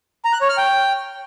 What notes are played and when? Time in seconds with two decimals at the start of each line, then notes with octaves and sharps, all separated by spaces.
0.25 A#5
0.33 F#6
0.41 C#5
0.49 F6
0.57 G5